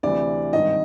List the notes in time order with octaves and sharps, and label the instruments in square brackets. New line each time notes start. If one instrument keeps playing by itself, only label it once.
[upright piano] D2 C3 E3 D5
G#1 G2 D#3 D#5